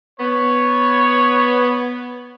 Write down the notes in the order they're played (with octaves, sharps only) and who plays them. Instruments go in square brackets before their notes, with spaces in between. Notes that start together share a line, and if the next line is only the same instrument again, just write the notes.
[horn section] B3 [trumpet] C#5